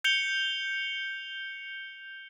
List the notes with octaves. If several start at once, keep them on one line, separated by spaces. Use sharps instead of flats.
G6 C#7 F7 G7